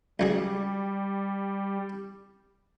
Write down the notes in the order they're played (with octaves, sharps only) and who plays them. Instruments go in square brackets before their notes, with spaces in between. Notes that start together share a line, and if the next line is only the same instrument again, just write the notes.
[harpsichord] C#2 F#3 G#4 [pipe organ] G3